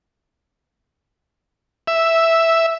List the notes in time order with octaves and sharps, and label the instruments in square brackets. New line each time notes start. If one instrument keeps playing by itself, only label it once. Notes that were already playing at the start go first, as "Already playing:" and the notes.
[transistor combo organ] E5